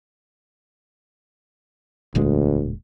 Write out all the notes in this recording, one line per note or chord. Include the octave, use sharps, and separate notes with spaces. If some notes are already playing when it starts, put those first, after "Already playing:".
E1 D2 A#2 G#3